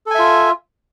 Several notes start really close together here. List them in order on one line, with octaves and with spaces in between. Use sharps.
A4 G#5 E5 F4